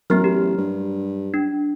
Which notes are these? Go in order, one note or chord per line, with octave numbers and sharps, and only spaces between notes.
A1 F#3 B3 A#4 F6
G4
G2
D4